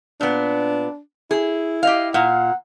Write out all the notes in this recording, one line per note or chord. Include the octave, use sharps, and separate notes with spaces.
A#2 B3 D4
E4 G#4
G4 D#5 F5
A#2 F5 F#5